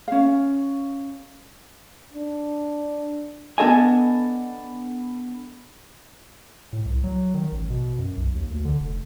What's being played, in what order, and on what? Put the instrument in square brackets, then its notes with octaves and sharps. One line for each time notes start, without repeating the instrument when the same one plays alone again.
[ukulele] C#4 F5
[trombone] D4
[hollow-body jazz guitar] B3 D4 A4 D#5 G#5
[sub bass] A2
C2
F#3
D#3
A1
B2
F#2
B1
D#2
D2
D3
F1